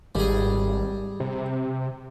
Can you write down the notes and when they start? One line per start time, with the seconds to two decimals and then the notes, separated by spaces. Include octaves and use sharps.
0.15 G#1 G3 G#4
1.20 C3